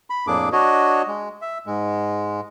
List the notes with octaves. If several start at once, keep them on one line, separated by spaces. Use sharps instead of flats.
B5
F2 A2 A#3 D4 G#4 D6
D4 F#4 C#5 D#5
G#3
E5
G#2 G#3